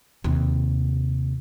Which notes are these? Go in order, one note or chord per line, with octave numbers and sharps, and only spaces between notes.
D#2 C3